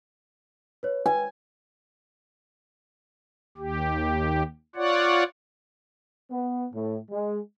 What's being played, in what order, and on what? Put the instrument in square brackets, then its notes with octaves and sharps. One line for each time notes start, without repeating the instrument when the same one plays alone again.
[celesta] B4 C#5
[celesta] B4 [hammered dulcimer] G#5
[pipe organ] D#2 G4
F4 C#5 D5 F#5
[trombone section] B3
A2
G#3